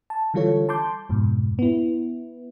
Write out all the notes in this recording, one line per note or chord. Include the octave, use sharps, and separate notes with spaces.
A5
D3 E3 G3 F4 A4 C#5
A5 C6 D6 G6
F2 G#2 B2
B3 E4